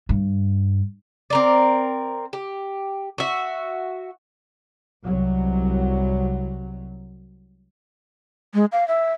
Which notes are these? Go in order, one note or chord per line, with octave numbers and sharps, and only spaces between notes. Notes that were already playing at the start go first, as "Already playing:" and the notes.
G2
C4 A#4 D5
G4
F#4 E5
C2 F#3
G#3
F5
E5